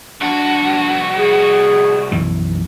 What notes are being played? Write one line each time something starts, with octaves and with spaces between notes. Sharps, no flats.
C2 D4 F#4
G#4
B1 F#2 E3